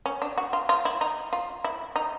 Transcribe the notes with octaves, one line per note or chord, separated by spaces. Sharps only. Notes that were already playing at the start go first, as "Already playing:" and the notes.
C#4
D4
F#4
F4
F4
E4
D#4
F4
E4
D#4